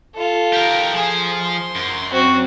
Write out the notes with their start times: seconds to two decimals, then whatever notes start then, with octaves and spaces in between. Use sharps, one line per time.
0.15 F4 A4
0.53 G4 A#4
0.93 F3 G#4 C5
1.42 C6
1.75 F#2
2.12 C4 F#4